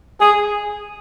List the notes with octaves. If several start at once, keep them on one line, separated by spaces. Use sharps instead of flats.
G#4